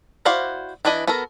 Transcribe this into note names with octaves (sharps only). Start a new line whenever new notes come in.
E4 F#4 C5 D5 F5
E3 D4 E4 B4 D#5
B3 F#4 A4 A#4